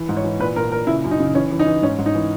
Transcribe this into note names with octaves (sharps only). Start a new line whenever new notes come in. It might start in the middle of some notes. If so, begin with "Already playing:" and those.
Already playing: E3
G#2
C#5
E3
A#2 B4
A#2 A#4
A#2 A#4
C#3 E4
F#2
D#4
C#3
E3 C#4
E3
D#4
E3
G#2 C#4
G#2
D#4
E3